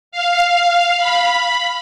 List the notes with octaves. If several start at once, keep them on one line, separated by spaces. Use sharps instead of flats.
F5
B5